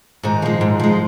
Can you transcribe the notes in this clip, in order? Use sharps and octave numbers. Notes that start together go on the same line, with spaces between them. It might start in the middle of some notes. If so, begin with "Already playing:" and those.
G#2 D#3 D#4
F3 G#3
G#2
F3 G#3